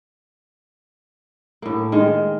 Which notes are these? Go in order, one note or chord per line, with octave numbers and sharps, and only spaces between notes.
A2 A#3
D#3 G#3